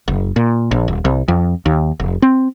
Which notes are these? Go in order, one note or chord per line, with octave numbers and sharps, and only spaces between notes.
F#1
A#2
A#1
D#1
C2
F2
D#2
F1
C4